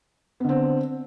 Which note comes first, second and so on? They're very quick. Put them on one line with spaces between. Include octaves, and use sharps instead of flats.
B3 D3 C4